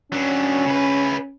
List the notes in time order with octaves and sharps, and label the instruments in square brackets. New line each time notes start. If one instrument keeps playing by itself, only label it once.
[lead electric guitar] F#3 D4 [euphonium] C#4
[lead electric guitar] C#3 B4